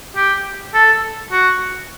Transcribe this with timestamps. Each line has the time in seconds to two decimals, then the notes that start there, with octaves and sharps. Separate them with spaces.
0.16 G4
0.74 A4
1.32 F#4